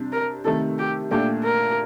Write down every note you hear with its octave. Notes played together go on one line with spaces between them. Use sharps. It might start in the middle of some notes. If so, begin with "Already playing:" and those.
Already playing: C3 G3 D4
A#4
C3 D#3 A3 A4
G4
A#2 A3 D4 G4
A#4